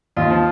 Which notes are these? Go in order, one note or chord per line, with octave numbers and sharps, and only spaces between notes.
D#2 F4
F3